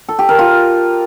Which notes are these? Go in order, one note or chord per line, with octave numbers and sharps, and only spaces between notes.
A4
G4
A#4
F4